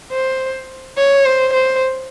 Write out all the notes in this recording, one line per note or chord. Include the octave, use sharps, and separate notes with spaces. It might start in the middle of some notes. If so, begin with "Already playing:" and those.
C5
C#5
C5
C5